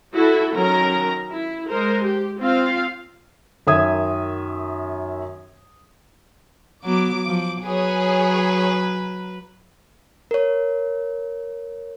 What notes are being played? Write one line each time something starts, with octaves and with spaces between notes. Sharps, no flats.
E4 F#4 A4
D#3 F#3 C#4 A#4 A#5
E4
G#3 A#4 C5
G4
C4 F4 F5
F#2 D#3 E5 D#6 G#6
F#3 B3 D6
F3
F#3 G#4 B4 C#5
A#4 C#5